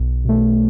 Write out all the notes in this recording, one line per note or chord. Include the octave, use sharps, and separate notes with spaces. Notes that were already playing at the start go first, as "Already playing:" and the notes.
Already playing: B1
B2 A3